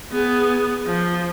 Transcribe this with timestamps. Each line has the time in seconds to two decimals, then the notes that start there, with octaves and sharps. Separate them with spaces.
0.12 B3 G#4
0.86 F3